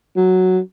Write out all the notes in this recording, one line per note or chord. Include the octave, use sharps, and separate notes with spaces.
F#3